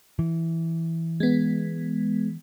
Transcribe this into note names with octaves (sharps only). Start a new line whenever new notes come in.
E3
G#3 B3